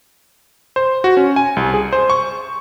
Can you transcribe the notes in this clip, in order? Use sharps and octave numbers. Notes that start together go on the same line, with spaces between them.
C5
F#4
C#4
G#5
C2
G#4
C5
C#6